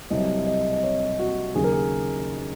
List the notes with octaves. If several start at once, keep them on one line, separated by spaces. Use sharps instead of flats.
C2 C3 F#3 D#5
D#5
D#5
C#5
F#4
D#2 C#3 F#3 G#4
A#4
G#4